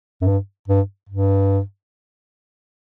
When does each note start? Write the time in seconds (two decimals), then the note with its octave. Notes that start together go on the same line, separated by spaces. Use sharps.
0.21 F#2
0.24 G2
0.68 G2
1.09 G2